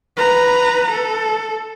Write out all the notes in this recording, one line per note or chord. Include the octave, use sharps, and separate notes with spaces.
B4 A#5
A4